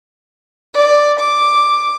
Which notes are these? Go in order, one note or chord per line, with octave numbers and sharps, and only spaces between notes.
D5
D6